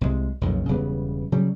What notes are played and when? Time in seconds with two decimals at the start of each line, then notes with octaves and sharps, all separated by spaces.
0.01 C2 C3 E3 G#3
0.41 B1 F2 A#2 C#3
0.68 E1 C#3 G3 B3
1.32 C#3 F#3 G3